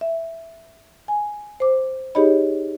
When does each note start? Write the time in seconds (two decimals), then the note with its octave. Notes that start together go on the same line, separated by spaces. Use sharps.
0.01 E5
1.08 G#5
1.60 C5 D6
2.15 D#4 G4 G#4 C#5 D#5 B5